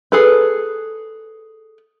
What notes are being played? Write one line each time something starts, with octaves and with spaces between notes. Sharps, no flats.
G#4 A4 B4